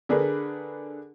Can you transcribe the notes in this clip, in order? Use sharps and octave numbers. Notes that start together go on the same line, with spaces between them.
D3 D4 G#4 A#4 B4